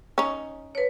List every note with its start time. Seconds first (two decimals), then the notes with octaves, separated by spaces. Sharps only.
0.18 C#4 D#4
0.75 B4 C#5